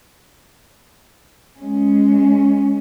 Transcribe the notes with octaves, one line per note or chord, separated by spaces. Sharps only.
G#3 C#4